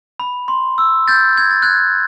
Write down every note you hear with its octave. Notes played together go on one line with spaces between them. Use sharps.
B5
C6
E6
G6 A6
G#6
A6
F#6 G#6